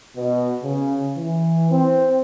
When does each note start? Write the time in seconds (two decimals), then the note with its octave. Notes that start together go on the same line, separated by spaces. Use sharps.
0.15 B2
0.62 C#3
1.15 E3
1.70 C4